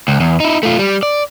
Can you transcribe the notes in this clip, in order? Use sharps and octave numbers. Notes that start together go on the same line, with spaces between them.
C#2
E2
D#4 E4
A3 F4
G3
D5